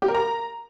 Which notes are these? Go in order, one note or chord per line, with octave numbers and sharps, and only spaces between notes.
G4
A#4
A#5